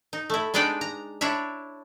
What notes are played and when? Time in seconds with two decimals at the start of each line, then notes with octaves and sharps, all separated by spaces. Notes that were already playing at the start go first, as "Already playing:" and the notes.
0.13 D#4
0.30 A3 E4
0.54 G#3 B3 D4 D#4 D5 G5
0.81 A#5
1.21 D4 E4 C#5 E5